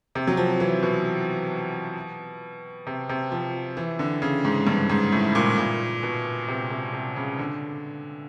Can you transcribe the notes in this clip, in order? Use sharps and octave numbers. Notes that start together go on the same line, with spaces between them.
C3
F#3
F3
E3
B2
C3
C3
F3
E3
D3
C#3
G#2
G2
G#2
A2
A#2
A#2
B2
C3
C3
C3
C#3
D3